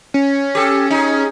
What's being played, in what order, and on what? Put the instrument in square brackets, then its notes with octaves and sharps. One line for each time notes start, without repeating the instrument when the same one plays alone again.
[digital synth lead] C#4
[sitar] G4 A4
[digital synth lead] C#4 [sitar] D#4 G#4